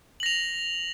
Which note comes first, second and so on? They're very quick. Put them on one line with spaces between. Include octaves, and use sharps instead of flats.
F#7 A#6 F7